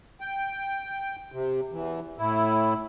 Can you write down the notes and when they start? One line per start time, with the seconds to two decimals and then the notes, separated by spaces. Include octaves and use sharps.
0.21 G5
1.32 C3
1.72 E2 E3
2.18 A2 E4